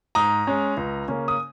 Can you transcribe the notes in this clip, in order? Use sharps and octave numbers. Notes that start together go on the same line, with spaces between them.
G#2 A#5 D#6
G#3 C#4
C#2
C#3 A#3 C#4
D#6